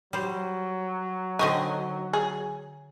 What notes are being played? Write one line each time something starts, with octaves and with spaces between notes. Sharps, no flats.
F#3 G3 C5
D3 D#3 C4 D#5 G#5
G#4